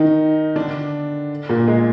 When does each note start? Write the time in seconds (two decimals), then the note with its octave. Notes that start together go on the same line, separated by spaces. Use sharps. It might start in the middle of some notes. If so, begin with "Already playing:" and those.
Already playing: D#3 D#4
0.56 D3 D4
1.49 A#2 A#3
1.68 G#3